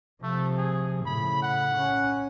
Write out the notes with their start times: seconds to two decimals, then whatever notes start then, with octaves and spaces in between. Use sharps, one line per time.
0.23 C3 F3 A3
0.57 G#4
1.06 A2 C#3 B5
1.42 F#5
1.76 C#4